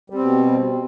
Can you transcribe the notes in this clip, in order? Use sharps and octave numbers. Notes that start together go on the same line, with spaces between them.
B2 G3 C4